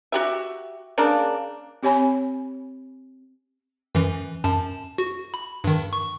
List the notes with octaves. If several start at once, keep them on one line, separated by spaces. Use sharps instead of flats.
F#4 G4 E5
C#3 A#3 D4
C4 G4 C#5 G#5 B5
F#2 E3
F#2 A5
F#4
B5
G2 D#3
C#6